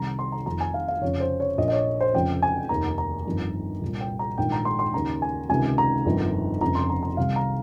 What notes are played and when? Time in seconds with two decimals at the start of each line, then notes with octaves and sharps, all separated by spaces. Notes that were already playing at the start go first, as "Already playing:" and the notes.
Already playing: C2 C3 D#3 A#5
0.19 C6
0.32 A#5
0.46 F1 F2 D#3 A#5
0.61 G#5
0.74 F5
0.88 F5
1.02 F1 F2 C#3 C#5
1.20 C5
1.40 C#5
1.58 A#1 D#5
1.62 A#2
1.68 D#5
1.72 C#5
2.01 C5
2.14 F1 F2 C#3 G5
2.42 G#5
2.69 F1 D#2 D#3 A#5
2.98 A#5
3.26 G1 F2 D#3
3.82 C2 A#2
4.00 G5
4.19 A#5
4.38 A#1 G#2 D#3 G5
4.52 A#5
4.65 C6
4.79 C6
4.94 D#2 C#3 A#5
5.22 G#5
5.49 C#2 C3 D#3 G#5
5.78 A#5
6.06 G1 F2 D#3
6.61 F1 F2 C#3 A#5
6.75 C6
6.90 A#5
7.03 A#5
7.17 C2 C3 D#3 F5
7.36 A#5